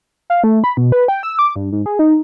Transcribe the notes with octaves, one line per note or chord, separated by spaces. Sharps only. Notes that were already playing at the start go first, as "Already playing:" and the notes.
F5
A3
B5
B2
B4
G5
E6
D6
G2
G#2
G#4
D#4